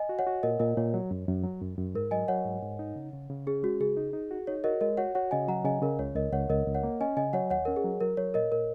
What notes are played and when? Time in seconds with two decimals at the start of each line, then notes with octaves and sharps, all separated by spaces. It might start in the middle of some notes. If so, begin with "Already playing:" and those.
Already playing: D#5 G#5
0.09 F#4
0.19 C#5 F#5
0.27 F#4
0.43 A#2 A#4 D#5
0.60 A#2 A#4 D#5
0.77 A#2 C#5
0.94 F#3
1.11 F#2
1.28 F#2
1.44 F#3
1.61 F#2
1.78 F#2
1.95 G#2 A#4
2.11 F#3 D#5 G#5
2.28 F#3 C#5 F#5
2.45 G#2
2.63 G#2
2.79 D#4
2.96 C#3
3.13 C#3
3.30 C#3
3.47 C#4 G#4
3.63 G#3 F#4
3.81 C#3 G#4
3.97 D#4
4.13 D#4
4.31 F#4
4.47 D#4 C#5
4.64 F#4 A#4 D#5
4.81 G#3 A#4 D#5
4.97 F#4 C#5 F#5
5.15 F#4 C#5 F#5
5.31 C#3 D#5 G#5
5.48 F#3 F#5 A#5
5.65 C#3 D#5 G#5
5.82 C#3 A#4
5.99 C#2 C#5
6.15 C#2 A#4 D#5
6.33 C#2 C#5 F#5
6.50 C#2 A#4 D#5
6.66 C#2
6.75 C#5 F#5
6.83 A#3
7.01 C#4 D#5 G#5
7.17 C#3 D#5 G#5
7.33 F#3 C#5 F#5
7.50 D#2 C#5 F#5
7.65 C#4 A#4
7.76 G#4
7.84 F#3
8.00 F#3 A#4
8.17 F#3 C#5
8.34 A#2 A#4 D#5
8.52 A#2 A#4